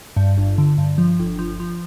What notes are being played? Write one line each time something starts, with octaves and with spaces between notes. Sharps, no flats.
G2
G1
D3
G2
F3
G1
F3
F3